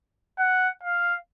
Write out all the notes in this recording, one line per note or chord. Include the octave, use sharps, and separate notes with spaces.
F#5
F5